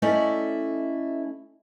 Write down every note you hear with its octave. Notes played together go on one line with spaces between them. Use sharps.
A3 C#4 E4 A4 D5 D#5